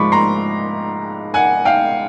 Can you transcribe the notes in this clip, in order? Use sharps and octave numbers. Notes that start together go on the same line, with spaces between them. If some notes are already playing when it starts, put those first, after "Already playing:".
Already playing: G#2 F3 G#3 B5 C#6 D6
A#5 C6
F#5 G#5
F5 G5